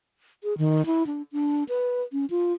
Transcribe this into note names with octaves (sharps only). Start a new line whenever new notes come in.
G#4
D#3
E4
D4
D4
B4
C#4
F4